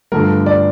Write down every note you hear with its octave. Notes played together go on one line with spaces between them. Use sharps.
G2 D3 F3 A3 A#4
D5